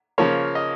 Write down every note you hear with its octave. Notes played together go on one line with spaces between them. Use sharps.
C#3 F3 A#3 C#5
D#5